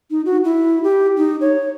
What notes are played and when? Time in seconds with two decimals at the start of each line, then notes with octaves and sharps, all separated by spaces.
0.11 D#4
0.25 F#4
0.44 E4
0.84 G4
1.17 D#4
1.41 C#5